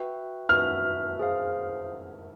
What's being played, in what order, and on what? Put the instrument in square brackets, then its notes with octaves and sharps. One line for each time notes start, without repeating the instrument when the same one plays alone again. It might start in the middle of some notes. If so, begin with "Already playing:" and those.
Already playing: [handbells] F#4 B4 E5 G5
[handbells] F#4 B4 E5 [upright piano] F6
[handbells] G#4 C5 F5